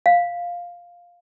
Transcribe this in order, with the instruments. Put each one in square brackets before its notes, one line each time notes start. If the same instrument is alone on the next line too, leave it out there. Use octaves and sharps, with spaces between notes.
[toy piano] F5